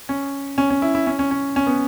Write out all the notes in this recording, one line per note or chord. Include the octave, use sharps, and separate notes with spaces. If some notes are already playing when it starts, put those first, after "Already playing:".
C#4
C#4
C#4
E4
E4
C#4
C#4
C#4
C#4
B3